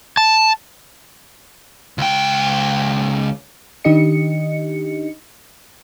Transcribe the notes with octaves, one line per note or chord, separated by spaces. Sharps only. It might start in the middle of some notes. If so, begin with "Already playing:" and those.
A5
C#2 G5
D#3 D4 D#4 G4 D#5 C#7